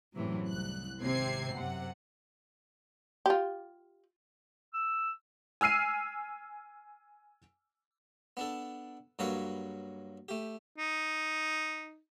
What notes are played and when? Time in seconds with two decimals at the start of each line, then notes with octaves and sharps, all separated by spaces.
0.15 F#2 A2 C3 E3 F#3
0.48 C2 F#6
1.01 G#1 C3 C4 G#6 C7
1.55 F#2 C3 F#5
3.26 F4 G4
4.74 E6
5.61 G#5 E6 F6 C7 D#7
8.37 B3 D4 A4
9.19 G2 F#3 A#3 A4 B4 C#5
10.29 A3 G4
10.78 D#4